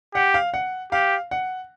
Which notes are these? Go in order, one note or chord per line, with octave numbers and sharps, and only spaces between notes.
G4 F#5
F5
F#5
G4 F5
F#5